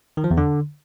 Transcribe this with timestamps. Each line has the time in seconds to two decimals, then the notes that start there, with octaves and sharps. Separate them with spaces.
0.17 D#3
0.24 F3
0.31 E2
0.37 D3